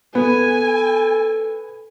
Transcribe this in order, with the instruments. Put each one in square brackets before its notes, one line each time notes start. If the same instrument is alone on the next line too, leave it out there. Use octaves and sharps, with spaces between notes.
[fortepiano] B3 [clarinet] A4 [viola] G#5